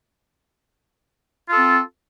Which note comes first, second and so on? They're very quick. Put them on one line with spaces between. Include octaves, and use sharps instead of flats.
F4 A4 C4